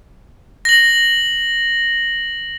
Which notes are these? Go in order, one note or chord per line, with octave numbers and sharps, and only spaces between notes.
A#6 F#7